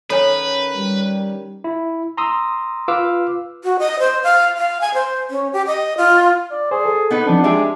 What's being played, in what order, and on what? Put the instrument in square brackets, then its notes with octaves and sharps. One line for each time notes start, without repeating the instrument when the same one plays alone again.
[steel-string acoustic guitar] D#3 C#4 [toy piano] A4 C#5 G#5 [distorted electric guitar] B4
[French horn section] G3
[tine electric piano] E4
A#5 C6 D#6 E6
F4 B4 F5 D6 E6 F6
[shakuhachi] F#4
D#5
C5
F5
F5
G#5
C5
C#4
G4
D#5
F4
[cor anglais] D5
[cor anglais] G#4 [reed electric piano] C5 D5
[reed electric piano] A4
[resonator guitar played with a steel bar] B3 D#4 B4
[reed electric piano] F3 C4 [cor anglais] D4
[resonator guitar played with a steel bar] G#3 G4 G#4 [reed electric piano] E5